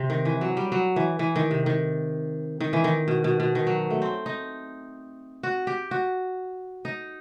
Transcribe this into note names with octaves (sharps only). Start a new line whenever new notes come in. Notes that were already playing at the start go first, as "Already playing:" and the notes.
Already playing: C3
D#3
E3
F#3
G3
F#3
E3
E3
D#3
C3
D#3
D#3
E3
D#3
B2
B2
B2
D#3
F#3
A3
C4
D#4
F#4
G4
F#4
D#4